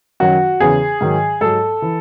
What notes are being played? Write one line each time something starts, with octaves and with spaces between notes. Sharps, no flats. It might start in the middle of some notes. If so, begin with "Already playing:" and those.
F#2 D#3 F#3 F#4
E2 C#3 E3 G#4
G#2 D#3 F#3
G#2 F#3 A4
E3